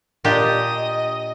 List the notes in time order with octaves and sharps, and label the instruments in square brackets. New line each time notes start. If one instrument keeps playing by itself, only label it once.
[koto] A#2 D4 G4 [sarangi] D#5